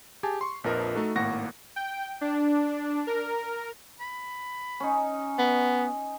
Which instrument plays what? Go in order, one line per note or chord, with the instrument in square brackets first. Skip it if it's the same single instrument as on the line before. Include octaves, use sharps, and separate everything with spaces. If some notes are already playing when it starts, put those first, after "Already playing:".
[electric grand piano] G4 G#4 G#5 A5
C6 C#6
A#1 F2 F3 A#4 B4 D#5
A3 D#4 F#4 A4
G#1 A2 A#3 F#5 C#6 A#6
[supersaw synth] G5
D4
A#4
[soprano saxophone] B5
[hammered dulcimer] C#4 D#4
[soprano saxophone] B3